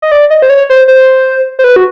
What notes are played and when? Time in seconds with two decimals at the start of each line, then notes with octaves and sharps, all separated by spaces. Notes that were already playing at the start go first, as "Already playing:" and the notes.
0.02 D#5
0.12 D5
0.30 D#5
0.42 C5
0.49 C#5
0.70 C5
0.88 C5
1.59 C5
1.64 B4
1.76 F#4